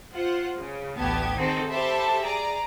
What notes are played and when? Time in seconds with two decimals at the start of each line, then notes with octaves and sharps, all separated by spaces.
0.14 F4 C5 F#5
0.59 C#3
0.97 A1 D2 B3 G4 A5 G#6
1.36 D#3 C4 D#4 F#4 G#4 A4
1.71 G4 A4 C5 E5 A5 B5
2.22 G#4 D5 A#5